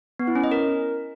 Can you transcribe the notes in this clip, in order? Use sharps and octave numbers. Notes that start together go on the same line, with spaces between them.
B3
E4
C#4
D#5
A#4